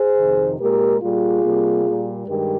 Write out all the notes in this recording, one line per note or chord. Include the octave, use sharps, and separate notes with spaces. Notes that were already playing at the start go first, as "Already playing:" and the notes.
Already playing: G#4 C5
F2 C3 D#3
A#2 G#3 G4 A#4
A#2 G3 A#3 F4 G#4
C3 G3 A#3
A#2 G3 A#3
G2 D#3 G#3 G4 A#4